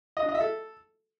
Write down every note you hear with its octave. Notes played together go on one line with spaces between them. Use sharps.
D#5
D4
D#5
E5
A4